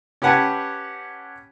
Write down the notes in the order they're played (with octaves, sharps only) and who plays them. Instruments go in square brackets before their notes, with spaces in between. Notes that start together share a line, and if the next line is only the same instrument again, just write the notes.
[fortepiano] C#4 G4 B4 F#5 G#5 A5